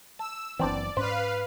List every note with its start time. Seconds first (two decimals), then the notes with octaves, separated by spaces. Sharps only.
0.19 A5 E6
0.59 F#1 E3 B3 C4 D4 D5
0.97 G#2 C#4 B4 C5 F5